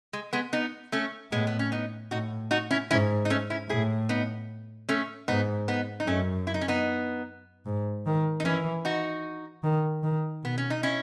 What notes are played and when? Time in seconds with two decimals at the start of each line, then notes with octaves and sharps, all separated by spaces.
0.13 G#3
0.33 G#3 B3
0.53 B3 D#4
0.92 A3 C#4
1.32 A2 G#3 B3
1.47 B3
1.59 C#4
1.72 B3 D#4
2.11 A2 D#4 F#4
2.51 D#4 F#4
2.71 C#4 E4
2.91 G#2 C#4 E4
3.25 D#4
3.30 A3 C#4
3.50 C#4 E4
3.69 A2 E4 G#4
4.09 B3 D#4
4.89 A3 C#4
5.28 G#2 B3 D#4
5.68 B3 D#4
6.00 D#4
6.07 F#2 A3 C#4
6.47 E4
6.54 D#4
6.61 C#4
6.68 B3 D#4
7.66 G#2
8.06 D#3
8.40 D#4
8.45 E3 C#4 E4
8.85 D#4 F#4
9.64 D#3
10.03 D#3
10.43 B2 B3
10.58 C#4
10.70 D#4
10.83 C#4 E4